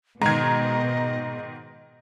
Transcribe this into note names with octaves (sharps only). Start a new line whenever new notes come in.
G#2 B2 D#3 D#5 A#5 G#6